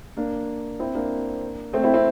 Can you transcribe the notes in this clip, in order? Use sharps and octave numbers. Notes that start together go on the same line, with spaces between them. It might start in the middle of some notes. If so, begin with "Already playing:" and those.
A#3 D4
C4 E4
A#3 D4
A3 C4
C4 E4
C4 E4